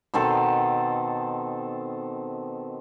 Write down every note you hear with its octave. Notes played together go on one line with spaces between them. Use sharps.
B2 D#3 C4 A4